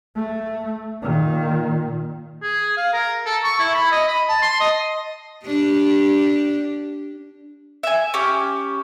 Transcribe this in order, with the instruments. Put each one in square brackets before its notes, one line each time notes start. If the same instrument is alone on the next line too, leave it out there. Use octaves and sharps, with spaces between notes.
[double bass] A3
A#2 D#3
[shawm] G#4
F5
A#4
A4
C#6
E4
B5
D#5
B5
A5
C6
D#5
[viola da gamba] D4 G4
[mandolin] E5 G#5
C#4 G4